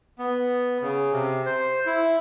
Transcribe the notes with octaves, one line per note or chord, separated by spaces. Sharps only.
B3
C#3
C3
C5
E4